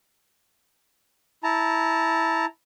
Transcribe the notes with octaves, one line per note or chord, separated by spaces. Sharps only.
E4 A5 A#5